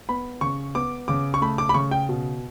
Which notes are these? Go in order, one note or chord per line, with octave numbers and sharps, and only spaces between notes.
B3 B5
C#3 C#6
B3 D6
C#3 D6
C#6
A3 B5
D6
B5
C#3 C#6
G5
B2